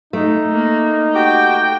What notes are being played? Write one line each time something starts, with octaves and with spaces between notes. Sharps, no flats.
A3 D#4
A#3
F#4 G4 G5 D6